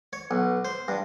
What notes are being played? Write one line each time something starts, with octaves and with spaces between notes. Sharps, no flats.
C#5
B1
C5
G2